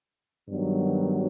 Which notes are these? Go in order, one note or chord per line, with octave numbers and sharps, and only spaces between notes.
G2 D#3 F#3 B3